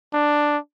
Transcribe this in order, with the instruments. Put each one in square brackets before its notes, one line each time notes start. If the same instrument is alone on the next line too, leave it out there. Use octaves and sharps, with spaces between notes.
[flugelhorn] D4